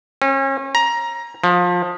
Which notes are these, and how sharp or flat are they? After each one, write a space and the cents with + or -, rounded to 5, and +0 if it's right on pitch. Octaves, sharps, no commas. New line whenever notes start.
C#4 -35
A#5 +15
F3 +25